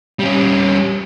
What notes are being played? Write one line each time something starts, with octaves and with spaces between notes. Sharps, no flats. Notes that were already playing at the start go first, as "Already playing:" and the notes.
G3 C#4